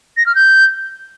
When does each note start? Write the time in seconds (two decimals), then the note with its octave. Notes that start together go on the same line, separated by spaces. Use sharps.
0.17 A#6
0.26 F6
0.35 G6